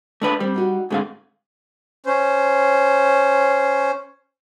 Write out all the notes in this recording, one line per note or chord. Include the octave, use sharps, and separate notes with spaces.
A3 D4 B4
G3 C4 C5
F#3 D#4 F#4
G#2 D3 A3 C4 G#4 F5
C#4 C5